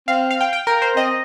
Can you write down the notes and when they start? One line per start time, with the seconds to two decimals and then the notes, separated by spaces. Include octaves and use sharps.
0.08 C4 F5
0.31 F5
0.41 G5
0.53 G5
0.67 A#4
0.82 C5
0.96 C4 D#5